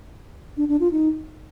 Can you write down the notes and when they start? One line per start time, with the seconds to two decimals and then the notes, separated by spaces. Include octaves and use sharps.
0.57 D4
0.69 D4
0.80 F4
0.92 D#4